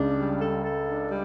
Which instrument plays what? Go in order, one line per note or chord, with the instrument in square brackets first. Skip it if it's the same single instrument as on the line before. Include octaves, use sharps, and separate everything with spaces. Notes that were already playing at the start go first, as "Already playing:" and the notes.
Already playing: [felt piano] C#2 C#3 [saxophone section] D4
[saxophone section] G3
A4
A4
D4
G3